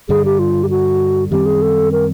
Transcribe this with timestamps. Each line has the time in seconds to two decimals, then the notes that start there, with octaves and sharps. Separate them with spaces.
0.09 G2 D3 G3 G#4
0.25 G4
0.39 F4
0.63 G4
0.70 F#4
1.31 F#2 D#3 G3 C4 G4
1.46 G#4
1.62 A4
1.92 A#4